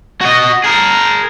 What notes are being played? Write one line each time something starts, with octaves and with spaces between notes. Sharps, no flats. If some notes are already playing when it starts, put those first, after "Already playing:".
F#4 D#5
G#4 A#4